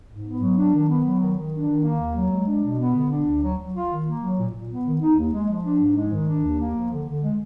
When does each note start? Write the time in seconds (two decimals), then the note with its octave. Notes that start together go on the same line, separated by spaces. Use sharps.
0.10 G#2
0.25 B3
0.41 F#3
0.57 D4
0.73 D#3
0.89 B3
1.05 F#3
1.20 D#3
1.36 D#3
1.53 D4
1.68 D#3
1.84 A#3
2.00 D#2
2.16 F#3
2.31 G#3
2.47 D4
2.64 B2
2.79 B3
2.95 D3
3.11 D4
3.27 D2
3.42 F#3
3.58 F#3
3.74 F4
3.90 D#3
4.06 A#3
4.22 F#3
4.38 A#2
4.53 A#2
4.70 B3
4.85 D#3
5.01 D#4
5.17 D#2
5.33 G#3
5.48 F3
5.64 D4
5.81 G#2
5.96 G#3
6.12 D#3
6.28 D4
6.44 D#2
6.59 A#3
6.75 F3
6.91 D3
7.07 D3
7.23 G#3